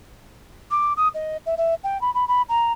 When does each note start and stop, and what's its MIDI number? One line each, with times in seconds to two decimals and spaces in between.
0.71 0.93 86
0.97 1.08 87
1.14 1.37 75
1.46 1.55 76
1.57 1.74 76
1.84 2.00 79
2.01 2.13 83
2.14 2.27 83
2.28 2.42 83
2.49 2.72 82